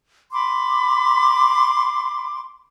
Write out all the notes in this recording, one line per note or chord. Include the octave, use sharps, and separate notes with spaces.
B5 C6 D6